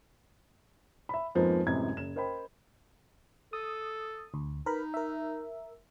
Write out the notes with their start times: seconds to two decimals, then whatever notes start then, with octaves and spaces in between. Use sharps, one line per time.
1.09 E5 B5
1.35 F2 G#2 F3 G#3 A#3 B3
1.66 F#2 A2 C3 E3 G#3 G#6
1.97 F#1 E7
2.16 A#4 C5 D#5 G5 B5
3.53 A4 D#6
4.34 D2
4.66 D#4 A#4 B4 B5
4.94 A#4 E5